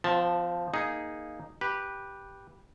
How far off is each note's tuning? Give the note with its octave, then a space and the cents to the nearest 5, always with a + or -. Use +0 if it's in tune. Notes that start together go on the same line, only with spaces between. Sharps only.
F3 +0 C4 -35 A5 -5
A#3 +0 D#4 +0 G#4 +0
G4 +0 B4 -15